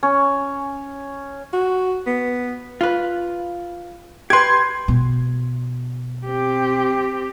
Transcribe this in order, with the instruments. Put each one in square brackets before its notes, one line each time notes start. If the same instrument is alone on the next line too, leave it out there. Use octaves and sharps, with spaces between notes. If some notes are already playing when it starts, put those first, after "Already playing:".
[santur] C#4
[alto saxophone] F#4
B3
[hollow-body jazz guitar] F4 B4
[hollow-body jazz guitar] G4 B4 [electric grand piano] C6 G#6
[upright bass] B2
[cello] C4 G4